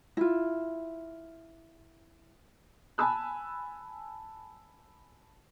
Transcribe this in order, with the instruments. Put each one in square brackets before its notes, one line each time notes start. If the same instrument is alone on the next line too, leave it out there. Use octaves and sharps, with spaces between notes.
[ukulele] E4 F4
[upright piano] G#5 A5 B5 E6 F#6